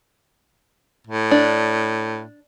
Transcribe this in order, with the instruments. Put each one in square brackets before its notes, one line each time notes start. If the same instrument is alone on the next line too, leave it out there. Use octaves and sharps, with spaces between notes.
[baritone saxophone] A2
[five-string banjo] D4